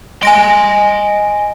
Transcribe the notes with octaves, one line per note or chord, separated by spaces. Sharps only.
D#5 G#5 C6 A#6 D7